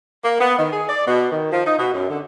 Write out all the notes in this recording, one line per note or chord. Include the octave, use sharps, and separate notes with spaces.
A#3
B3
D#3
G#4
D5
B2
D#3
F3
D#4
B2
F#2
D3